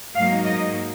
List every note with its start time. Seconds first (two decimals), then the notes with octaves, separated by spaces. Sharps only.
0.14 G#2 F#3 A#3 D#4 F5
0.45 D#5